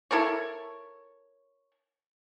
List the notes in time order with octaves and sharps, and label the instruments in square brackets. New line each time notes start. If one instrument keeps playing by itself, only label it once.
[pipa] E4 A4 A#4 C#5